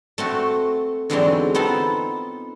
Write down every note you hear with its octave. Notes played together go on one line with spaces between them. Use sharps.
A3 C4 F#4
E2 G#2 D3 F#3 G#3 C4
B3 C4 D#4 F4 A4